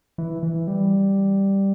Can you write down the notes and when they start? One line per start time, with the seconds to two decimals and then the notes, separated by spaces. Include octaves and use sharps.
0.18 E3
0.43 E3
0.68 G3